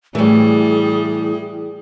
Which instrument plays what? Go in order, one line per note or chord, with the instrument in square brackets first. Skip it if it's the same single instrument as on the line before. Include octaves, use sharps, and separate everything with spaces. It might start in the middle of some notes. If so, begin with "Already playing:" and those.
[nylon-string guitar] A2 E3 [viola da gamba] G3 [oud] A3 C#4 [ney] G#4